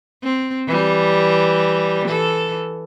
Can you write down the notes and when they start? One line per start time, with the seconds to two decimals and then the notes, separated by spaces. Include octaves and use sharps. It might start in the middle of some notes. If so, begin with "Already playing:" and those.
0.23 C4
0.67 E3 G3
2.06 E3 A4